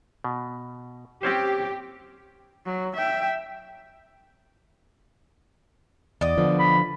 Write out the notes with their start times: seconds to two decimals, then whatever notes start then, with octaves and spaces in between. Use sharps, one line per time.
0.24 B2
1.23 C4 C#4 G4 C5
2.66 F#3
2.96 E5 G5
6.21 E2 D5 D#5
6.37 D3 F3 B3
6.60 B5